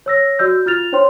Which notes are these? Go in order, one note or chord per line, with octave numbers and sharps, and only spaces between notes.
C#5 E6 A#6
F#4 D5 E6 G6
F4 F6 A6 F7
D4 C5 C#5 G5 C6